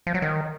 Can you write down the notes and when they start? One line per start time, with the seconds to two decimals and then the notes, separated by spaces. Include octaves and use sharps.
0.07 F3
0.14 F#3
0.22 D#3